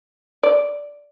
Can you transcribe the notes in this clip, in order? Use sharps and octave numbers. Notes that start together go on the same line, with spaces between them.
D5